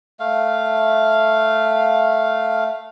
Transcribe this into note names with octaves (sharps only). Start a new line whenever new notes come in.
A3 F5